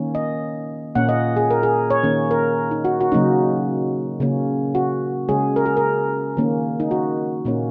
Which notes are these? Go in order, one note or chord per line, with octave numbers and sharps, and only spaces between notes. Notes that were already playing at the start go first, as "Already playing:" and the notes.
Already playing: D#3 A#3 C#4
D#5
A#2 A#3 C#4 F#5
D#5
G#4
A#4
G#4
C#5
D#3 A#3 C#4
A#4
D#4
F#4
F#4
C#3 F#3 A#3 C#4 D#4
C#3 A#3 C#4
F#4
C#3 G#3 C#4 G#4
A#4
G#4
A#4
D#3 A#3 C#4
D#4
F#4
A#2 A#3 C#4